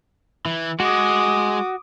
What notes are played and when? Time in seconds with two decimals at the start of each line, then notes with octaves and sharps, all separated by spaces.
0.46 E3
0.80 G#3 F#4 D6 D#6